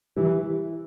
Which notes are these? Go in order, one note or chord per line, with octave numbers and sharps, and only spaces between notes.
E3 G3